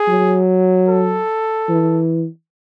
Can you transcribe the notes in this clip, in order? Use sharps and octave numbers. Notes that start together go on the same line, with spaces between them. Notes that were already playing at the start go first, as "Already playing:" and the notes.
Already playing: G#4
F#3
A4
E3